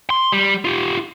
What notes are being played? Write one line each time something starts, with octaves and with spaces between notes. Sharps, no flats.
C6
G3
F4 G4